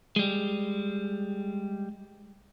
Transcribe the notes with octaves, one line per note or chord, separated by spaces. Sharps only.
G3 G#3